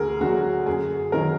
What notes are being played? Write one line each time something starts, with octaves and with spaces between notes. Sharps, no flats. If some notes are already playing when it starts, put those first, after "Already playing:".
Already playing: D2 G#4 A#4
D3 F#3 F#4
F#2 G#4
D#3 F#3 A#4